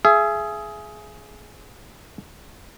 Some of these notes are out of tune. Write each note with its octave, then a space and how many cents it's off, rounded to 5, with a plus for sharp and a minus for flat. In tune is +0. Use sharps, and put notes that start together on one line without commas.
G#4 +15 E5 +40